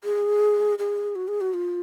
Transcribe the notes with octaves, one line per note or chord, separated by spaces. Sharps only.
G#4
G#4
F#4
G#4
F#4
F4